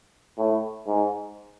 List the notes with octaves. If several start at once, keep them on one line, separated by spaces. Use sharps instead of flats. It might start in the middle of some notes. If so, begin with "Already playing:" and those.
A2
G#2